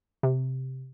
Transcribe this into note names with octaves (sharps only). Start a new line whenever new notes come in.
C3